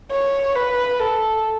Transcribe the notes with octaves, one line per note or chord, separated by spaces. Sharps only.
C#5
B4
A4